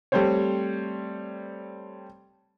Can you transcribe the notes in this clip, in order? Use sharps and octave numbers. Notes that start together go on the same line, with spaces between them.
G3 A3 C4 C5 C#5